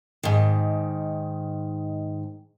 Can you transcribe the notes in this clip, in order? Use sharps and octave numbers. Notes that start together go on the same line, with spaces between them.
G#2 D#3